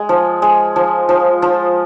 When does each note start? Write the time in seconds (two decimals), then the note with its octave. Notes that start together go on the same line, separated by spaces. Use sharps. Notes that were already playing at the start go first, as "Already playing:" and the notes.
Already playing: G#3
0.09 F3
0.42 G#3
0.76 F3
1.09 F3
1.42 F3